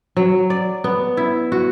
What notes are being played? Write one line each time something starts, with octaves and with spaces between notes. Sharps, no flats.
F#3
D5
B3
E4
F#4